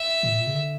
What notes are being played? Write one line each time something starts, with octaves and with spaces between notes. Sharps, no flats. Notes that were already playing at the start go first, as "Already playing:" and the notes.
Already playing: E5
A2
A#2
C#3
D3